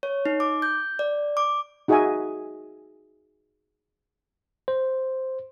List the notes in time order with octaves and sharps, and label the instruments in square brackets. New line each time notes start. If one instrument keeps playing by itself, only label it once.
[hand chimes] C#5
D#4
D6
G6
D5
D6
[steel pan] D#4 F#4 G#4 D#5 E5 G#5
[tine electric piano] C5